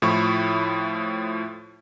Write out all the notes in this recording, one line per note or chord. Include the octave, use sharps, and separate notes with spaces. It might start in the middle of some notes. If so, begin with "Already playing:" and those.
A2 F3 E4 B5 C#6